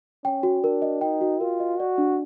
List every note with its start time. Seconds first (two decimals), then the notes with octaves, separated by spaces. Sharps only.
0.24 C#4 G5
0.43 F#4
0.63 D4 A#4
0.82 D#5
1.01 D#4 G5
1.21 F#4
1.40 F4 A#4
1.60 D#5
1.79 F#4 D5
1.98 D4